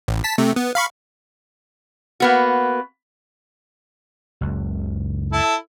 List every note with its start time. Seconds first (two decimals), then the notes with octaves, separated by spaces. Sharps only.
0.08 A1
0.24 A5 B6
0.38 C3 A3
0.56 B3
0.75 F5 B5 C#6
2.20 A#3 B3 F#4
4.41 F#1 C#2
5.32 E4 A4